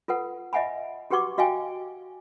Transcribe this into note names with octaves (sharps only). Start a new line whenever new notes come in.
F4 A4 B4 F#5
D#5 E5 F#5 G#5 B5
F#4 G4 B4 F#5 C#6 D6
F#4 D#5 F5 G5 G#5